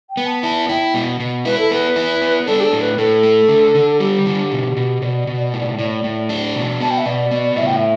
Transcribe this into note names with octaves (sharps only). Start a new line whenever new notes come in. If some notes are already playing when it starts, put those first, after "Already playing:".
G5
B3
A5
E4 A5
E4 G5
B2
B2
E4 B4
A4
B3 B4
E4
B3
D4 A4
G4
A4
A2
B4
A2 A4
A3
D3
D3
G3 G4
D3
B2
B2
B2 D5
B2
A2
A2
A2
D4
B2
B3 A5
G5
E5
B2 D5
B3
A2 E5
G5
E5